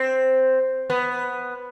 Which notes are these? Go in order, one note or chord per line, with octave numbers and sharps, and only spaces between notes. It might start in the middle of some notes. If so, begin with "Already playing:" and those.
Already playing: C4
B3